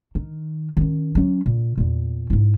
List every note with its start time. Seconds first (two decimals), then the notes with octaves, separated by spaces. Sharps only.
0.15 D#3
0.77 D#3 C#4
1.15 F#3 C#4
1.46 A#2
1.78 E2 A#2
2.30 G#2 E4